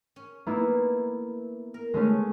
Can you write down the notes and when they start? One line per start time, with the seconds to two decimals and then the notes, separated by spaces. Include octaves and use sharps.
0.16 C#4
0.46 A#3 B3 E4
1.74 A#4
1.94 G#3 A3 C#4